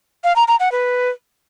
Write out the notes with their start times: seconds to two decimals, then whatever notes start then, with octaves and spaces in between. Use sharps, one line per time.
0.24 F5
0.36 A#5
0.48 A#5
0.60 F#5
0.72 B4